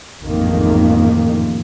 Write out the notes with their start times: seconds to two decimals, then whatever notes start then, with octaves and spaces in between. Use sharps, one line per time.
0.21 A1 F2 G#2 D#3 A#3